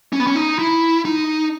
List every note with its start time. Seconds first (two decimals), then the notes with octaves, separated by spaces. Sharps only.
0.13 C#4
0.20 B3
0.27 C#4
0.35 D#4
0.59 E4
1.05 D#4